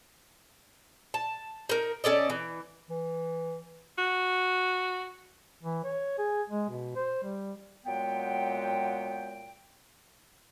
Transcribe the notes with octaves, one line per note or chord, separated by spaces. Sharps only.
A5
D#4 A#4
C#4 A4 D5 D#5
E3
E3
F#4
E3
C#5
G#4
G#3
B2
C5
G3
A#2 F#3 G#3 B3 G5